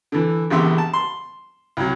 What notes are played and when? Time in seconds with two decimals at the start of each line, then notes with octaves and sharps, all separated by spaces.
0.12 D3 E3
0.50 A#1 E2 C#3 G4 E5 C6
0.78 A5
0.94 C6
1.77 C2 F#3